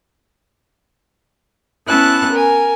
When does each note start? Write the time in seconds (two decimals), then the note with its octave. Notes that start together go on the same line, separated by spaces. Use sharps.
1.88 B3 C#4 E4 A5 F#6
2.32 A#4 G#5